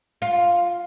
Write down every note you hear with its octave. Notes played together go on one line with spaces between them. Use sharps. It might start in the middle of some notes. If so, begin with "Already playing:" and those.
F4